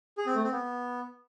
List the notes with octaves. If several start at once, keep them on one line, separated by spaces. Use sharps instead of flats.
G#4
C4
A3
C4
B3